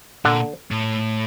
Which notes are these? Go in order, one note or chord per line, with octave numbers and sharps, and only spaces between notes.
A#2 D3 D4
A2